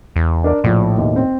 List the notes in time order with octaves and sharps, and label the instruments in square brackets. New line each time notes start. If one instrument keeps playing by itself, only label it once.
[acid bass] E2
[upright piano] D4 A#4 D5
[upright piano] A#1 [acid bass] A2
[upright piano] D#2 B2
C4